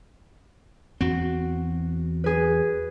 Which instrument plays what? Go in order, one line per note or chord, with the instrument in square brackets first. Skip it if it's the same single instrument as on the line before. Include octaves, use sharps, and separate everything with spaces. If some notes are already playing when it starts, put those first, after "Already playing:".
[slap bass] E2 C4 [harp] F#4
[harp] G#4 B4